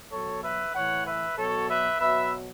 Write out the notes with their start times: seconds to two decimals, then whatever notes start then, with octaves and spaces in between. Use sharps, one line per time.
0.11 B2 F#3 A4 C#5
0.42 B4 E5
0.73 A2 E3 C#5 F#5
1.05 B4 E5
1.36 B2 F#3 A4 C#5
1.68 B4 E5
1.99 B2 F#3 B4 E5